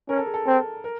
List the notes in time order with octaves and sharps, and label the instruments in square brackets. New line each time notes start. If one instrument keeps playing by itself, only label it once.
[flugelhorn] C#4 [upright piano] A#4
[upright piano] A4
G#4
A4
[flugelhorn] C4 [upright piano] A4
[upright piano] A#4